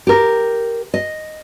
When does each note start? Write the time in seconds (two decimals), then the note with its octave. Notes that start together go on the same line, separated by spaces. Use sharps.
0.07 G4 A#4
0.94 D#5